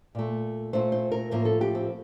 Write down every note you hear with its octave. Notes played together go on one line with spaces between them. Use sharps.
A#2 A3
A#2 A3 C5
C5
A#4
A2 F3 A#3 A#4
A4
G4
C4